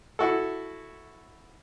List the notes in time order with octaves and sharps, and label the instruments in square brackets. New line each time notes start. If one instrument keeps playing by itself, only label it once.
[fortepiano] E4 F#4 A4